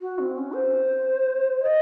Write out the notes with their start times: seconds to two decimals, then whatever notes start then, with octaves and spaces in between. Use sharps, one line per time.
0.01 F#4
0.19 C4
0.38 C#4
0.54 C5
1.63 D#5